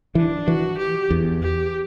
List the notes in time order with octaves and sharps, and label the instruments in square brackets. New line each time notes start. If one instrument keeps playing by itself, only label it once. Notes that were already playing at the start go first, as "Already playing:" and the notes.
[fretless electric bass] E3 [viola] D4
[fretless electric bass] E3 [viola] F#4
[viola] G4
[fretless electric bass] E2
[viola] G4